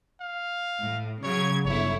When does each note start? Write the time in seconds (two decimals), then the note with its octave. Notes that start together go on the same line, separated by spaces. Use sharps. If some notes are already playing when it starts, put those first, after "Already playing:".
0.21 F5
0.83 A2
1.24 C#3 F#3 C#5 G#6
1.66 G1 E4 C#5